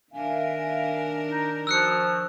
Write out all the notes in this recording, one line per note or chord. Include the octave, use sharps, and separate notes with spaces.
D#3 D4 A#4 E5 F5 G#5
D#4
F3 F#4 C#6 D#6 E6 F#6 C#7